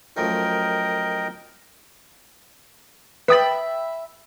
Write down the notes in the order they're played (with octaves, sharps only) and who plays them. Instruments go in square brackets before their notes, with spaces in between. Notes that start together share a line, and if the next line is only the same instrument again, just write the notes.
[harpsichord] F#2 F3 A3 [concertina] A#4 D#5 G5
[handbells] B4 D#6 A6 [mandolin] E5 G5 B5